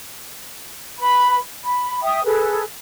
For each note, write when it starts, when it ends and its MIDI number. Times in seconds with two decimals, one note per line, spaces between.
0.98 1.38 71
0.98 1.38 83
1.64 2.00 83
2.03 2.22 76
2.03 2.22 79
2.03 2.22 87
2.25 2.63 68
2.25 2.63 69
2.25 2.63 71